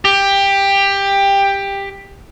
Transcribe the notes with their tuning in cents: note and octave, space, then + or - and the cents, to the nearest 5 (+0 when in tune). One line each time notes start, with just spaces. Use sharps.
G4 +15